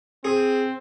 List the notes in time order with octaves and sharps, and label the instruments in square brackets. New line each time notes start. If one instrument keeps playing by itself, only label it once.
[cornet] C4 [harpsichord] G#4